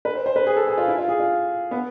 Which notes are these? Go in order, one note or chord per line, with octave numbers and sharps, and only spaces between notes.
B4
C5
C5
B4
G#4
A4
G#4
F4
E4
F4
G#4
F4
B3